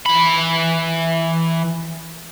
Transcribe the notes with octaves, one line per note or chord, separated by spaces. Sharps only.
E3 B5